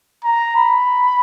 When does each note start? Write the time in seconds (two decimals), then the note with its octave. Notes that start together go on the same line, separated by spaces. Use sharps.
0.25 A#5
0.57 B5